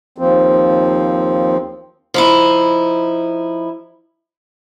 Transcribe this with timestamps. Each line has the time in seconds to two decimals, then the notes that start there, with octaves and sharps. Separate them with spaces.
0.18 D#2 F3 C4
2.14 F3 D#4 E4